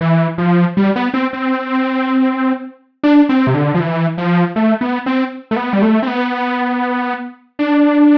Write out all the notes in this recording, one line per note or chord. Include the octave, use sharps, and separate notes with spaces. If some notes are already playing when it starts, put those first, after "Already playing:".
E3
F3
G3
B3
C4
C4
D4
C4
C3
D3
F3
E3
F3
A3
B3
C4
A3
B3
G3
A3
C4
B3
D4